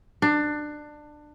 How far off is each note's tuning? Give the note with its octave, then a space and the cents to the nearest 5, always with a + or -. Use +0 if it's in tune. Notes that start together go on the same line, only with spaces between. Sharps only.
D4 +20